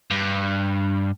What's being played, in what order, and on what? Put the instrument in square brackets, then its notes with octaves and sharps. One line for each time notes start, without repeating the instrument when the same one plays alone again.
[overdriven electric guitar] G2